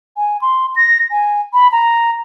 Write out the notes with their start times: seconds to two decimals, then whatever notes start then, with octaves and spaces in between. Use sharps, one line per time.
0.17 G#5
0.42 C6
0.76 A#6
1.11 G#5
1.53 B5
1.72 A#5